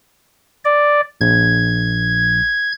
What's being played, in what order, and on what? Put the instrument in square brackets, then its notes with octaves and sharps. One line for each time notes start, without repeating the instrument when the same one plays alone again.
[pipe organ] D5
[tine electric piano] A#1 [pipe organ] G#6